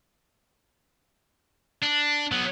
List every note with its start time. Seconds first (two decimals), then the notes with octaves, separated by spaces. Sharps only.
1.83 D4
2.32 F#3 B3